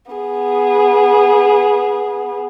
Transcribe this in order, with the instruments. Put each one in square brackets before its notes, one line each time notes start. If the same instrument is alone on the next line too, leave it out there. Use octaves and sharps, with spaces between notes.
[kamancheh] B3 G#4